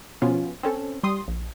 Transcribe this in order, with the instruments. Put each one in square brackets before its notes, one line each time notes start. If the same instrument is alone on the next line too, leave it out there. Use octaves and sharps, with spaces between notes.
[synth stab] B2 F3 B3 C#4 F4
C4 C#4 A4
G3 C6 D#6
A#1